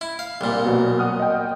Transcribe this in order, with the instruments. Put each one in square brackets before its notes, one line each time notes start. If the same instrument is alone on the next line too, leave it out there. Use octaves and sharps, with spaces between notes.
[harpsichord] E4
F5
C2 A#2
[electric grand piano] B2 F#3
F#5 D#6 F6
D#5 G5